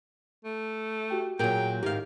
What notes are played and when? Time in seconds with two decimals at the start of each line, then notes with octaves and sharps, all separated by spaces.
0.44 A3
1.10 F#4 G4 G5
1.39 A#2 F#3 A#3 G#4 A#4 G5
1.83 G#2 D#3 G4 F5